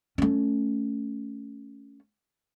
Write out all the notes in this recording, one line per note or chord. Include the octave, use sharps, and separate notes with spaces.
A3 C#4